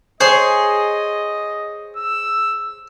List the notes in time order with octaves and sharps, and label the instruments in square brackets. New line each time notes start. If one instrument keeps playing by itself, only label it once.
[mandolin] G#4 [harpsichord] C5 C#5 C6 [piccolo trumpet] D#5
[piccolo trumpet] E6